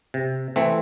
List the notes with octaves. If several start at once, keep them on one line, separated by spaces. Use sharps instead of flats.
C3
E3 A3 C4